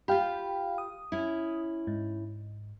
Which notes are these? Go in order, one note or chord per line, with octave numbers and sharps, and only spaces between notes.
F4 G4 F5 G5 B5
D#6
C#4 E4
G#2